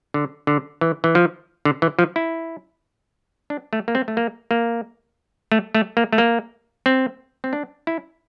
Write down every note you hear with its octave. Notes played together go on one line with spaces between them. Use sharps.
D3
D3
E3
E3
F3
D3
E3
F3
E4
D4
A3
A#3
C4
A3
A#3
A#3
A3
A3
A#3
A3
A#3
C4
C4
D4
E4